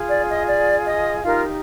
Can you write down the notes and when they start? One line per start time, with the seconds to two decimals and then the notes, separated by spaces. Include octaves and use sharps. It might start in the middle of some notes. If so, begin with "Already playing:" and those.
Already playing: F4 G#4
0.10 D5
0.29 D#5
0.49 D5
0.86 D#5
1.23 D#4 F4 G4 A#4 F5